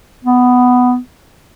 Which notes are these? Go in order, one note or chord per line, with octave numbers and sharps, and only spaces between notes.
B3